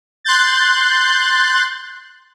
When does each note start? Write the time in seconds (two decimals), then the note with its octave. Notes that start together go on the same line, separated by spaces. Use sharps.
0.24 C6 F#6 G6 A6